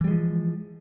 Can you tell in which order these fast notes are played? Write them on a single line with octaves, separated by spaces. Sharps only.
E3 G3 G#3 F3